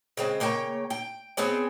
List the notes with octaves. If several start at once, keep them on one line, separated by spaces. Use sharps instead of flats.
C#3 G#3 C4
C#3 A#3 C#5 G5
G5
B3 C4 G#4 C#5